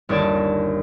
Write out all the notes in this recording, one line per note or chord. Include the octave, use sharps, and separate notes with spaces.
G1 D#2 D4 C#5 D5 A5